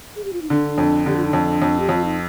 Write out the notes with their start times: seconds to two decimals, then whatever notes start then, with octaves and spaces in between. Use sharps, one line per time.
0.16 G#4
0.24 G4
0.33 F4
0.42 D#4
0.50 D3 D4
0.78 F2
1.06 D3 G4
1.16 F4
1.25 D#4
1.33 F2 D4
1.62 F2
1.80 G4
1.89 F2 F4
2.04 D#4